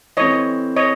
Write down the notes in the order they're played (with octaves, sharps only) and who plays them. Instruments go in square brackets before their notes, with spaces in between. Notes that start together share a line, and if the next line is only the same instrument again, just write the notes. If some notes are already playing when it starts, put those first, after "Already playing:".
[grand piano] E3 A3 C4 [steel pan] C#5 D#5
[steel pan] C#5 D#5